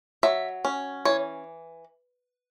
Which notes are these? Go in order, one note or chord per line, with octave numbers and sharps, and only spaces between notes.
F#3 E5
C#4
E3 C#5